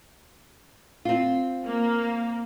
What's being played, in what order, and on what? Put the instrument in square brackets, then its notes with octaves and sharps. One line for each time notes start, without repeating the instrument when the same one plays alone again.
[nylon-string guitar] C4 F4
[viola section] A#3